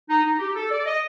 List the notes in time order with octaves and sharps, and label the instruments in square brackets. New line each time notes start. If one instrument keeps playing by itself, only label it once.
[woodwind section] D#4
D#4
G4
A4
D5
D#5